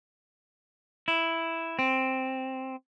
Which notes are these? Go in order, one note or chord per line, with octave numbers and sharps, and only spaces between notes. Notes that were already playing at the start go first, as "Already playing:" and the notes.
E4
C4